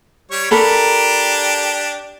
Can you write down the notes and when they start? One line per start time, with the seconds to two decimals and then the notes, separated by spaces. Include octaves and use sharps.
0.31 G3 C#5 C#6
0.51 D4 G4 A4 A#4 B5